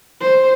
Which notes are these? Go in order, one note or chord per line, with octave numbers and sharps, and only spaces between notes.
C5